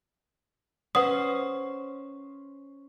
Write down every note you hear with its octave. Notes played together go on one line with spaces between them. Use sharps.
C#4 B4 C5 F#5 D#6